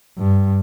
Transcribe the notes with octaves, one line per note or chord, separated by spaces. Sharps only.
G2